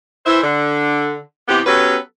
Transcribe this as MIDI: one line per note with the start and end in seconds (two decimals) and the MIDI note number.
0.26 0.39 52
0.26 0.39 72
0.26 0.39 76
0.42 1.19 50
1.48 1.61 48
1.48 1.61 52
1.48 1.61 59
1.48 1.61 67
1.66 1.96 54
1.66 1.96 59
1.66 1.96 61
1.66 1.96 67
1.66 1.96 69
1.66 1.96 71